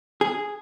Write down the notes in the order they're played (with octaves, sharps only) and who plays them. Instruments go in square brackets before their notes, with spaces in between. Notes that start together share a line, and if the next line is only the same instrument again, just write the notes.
[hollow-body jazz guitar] G#4